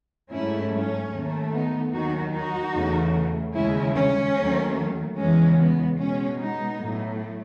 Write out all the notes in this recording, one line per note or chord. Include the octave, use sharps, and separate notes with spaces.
G#2 F#3 A3 C#4 E4
C#4
D#2 D#3 A3
B3 D#4
D#2 D#3 F#3 D#4 F#4
D#4 F#4
E2 C#3 E3 A3
D#2 C#3 G#3 C#4 E4
C#4
D#2 D#3 F#3 A3
E2 C#3 E3 G#3 C#4
B3
B2 G#3 C#4
B3 D#4
A2 F#3 A3